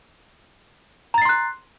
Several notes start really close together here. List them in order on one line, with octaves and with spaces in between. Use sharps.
A#5 A6 C7 C6 F#6